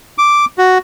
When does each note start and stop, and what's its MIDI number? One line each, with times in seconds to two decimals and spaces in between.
0.18 0.45 86
0.58 0.78 66